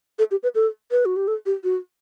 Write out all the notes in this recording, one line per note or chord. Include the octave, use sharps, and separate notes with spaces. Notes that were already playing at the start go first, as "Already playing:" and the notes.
A4
G4
B4
A4
B4
F#4
G4
A4
G4
F#4